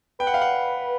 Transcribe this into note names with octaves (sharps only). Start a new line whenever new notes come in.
B4 G5
F#5
F5
F#5